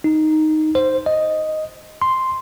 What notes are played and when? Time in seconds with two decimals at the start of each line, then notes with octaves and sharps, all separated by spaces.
0.04 D#4
0.75 C5
1.06 D#5
2.02 C6